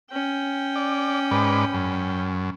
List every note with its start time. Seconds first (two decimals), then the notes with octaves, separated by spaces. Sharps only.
0.12 C#4 G5
0.76 D5
1.31 G#2 B4 D5
1.74 F#2